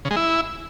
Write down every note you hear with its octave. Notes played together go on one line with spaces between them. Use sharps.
C#3
G#3
E4